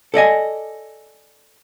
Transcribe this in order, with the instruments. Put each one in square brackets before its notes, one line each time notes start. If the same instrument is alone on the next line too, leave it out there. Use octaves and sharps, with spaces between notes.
[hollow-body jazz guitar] A4 D5 D#5 G#5